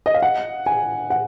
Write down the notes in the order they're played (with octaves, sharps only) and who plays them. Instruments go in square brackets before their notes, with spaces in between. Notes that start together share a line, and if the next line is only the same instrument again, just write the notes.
[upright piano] D#5
F5
F#5
G#5
F#5